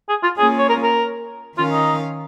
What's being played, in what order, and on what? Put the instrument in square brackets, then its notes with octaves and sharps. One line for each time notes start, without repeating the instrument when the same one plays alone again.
[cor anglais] G#4
F4
[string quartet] A#3 C#4 F4 [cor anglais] G#4
[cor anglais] C#5
A#4
A#4
[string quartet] D#3 C#4 A#4 F5 [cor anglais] F4
[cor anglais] D#4